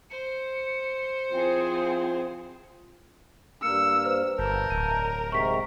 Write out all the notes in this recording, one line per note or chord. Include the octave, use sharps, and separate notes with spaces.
C5 C#7
F3 C4 E4 F4 G#4
G2 A#3 E6 F6 C#7
B4 C5
G1 A#4 A5 G6
D1 D#7
G#2 C3 A#5 C#6 B6